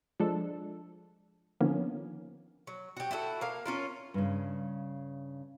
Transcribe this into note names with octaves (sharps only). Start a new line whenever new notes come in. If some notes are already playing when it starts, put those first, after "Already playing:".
F3 G#3 D4 A4
D3 D#3 F3 A#3 B3 C#4
F#3
F#4 G4
E4 F#4 G4 A4
A#3 F5
C#4 F4 A#4
G2 C#3